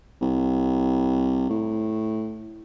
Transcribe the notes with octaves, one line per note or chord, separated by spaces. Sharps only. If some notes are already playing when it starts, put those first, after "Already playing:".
C2
A2